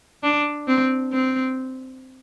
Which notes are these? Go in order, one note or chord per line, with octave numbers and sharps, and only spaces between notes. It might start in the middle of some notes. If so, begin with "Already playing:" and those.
D4
C4
C4